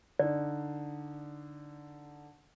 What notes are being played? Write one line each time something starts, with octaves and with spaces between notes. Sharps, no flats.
D3 D#4 D5